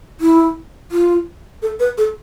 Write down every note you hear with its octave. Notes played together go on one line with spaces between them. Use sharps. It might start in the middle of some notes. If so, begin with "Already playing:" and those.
E4
F4
A4
B4
A4